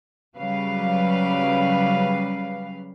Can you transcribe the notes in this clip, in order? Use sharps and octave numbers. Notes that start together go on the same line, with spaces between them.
C#3 F#3 G3 B4 F5